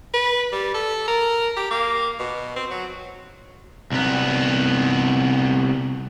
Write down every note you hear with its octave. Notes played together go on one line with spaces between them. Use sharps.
B4
G3
A4
A#4
G4
A#3
B2
C4
F#3
C2 B3